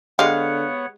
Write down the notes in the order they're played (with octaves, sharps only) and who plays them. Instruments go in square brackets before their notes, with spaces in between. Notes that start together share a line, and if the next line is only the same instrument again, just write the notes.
[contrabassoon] D3 [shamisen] G#3 G4 [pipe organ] B3 C#5 F#5 [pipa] F5